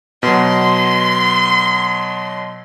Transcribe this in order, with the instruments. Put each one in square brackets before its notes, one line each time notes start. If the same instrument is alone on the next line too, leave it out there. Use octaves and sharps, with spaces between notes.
[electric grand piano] B2 F#3 [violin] C6